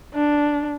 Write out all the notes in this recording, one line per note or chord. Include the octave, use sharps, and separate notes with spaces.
D4